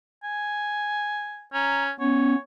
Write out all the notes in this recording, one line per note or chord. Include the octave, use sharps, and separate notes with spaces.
G#5
C#4 A#5
B3 C#4 C#5